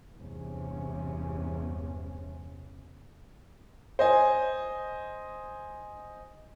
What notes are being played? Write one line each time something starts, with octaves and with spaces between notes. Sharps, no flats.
E2 G2 C3 C#4
C5 D#5 G#5